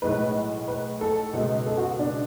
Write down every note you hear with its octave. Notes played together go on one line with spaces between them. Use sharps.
B1 A2 G#3 B4
B4
A4
C#2 B2 G#3
A4
F#4
D4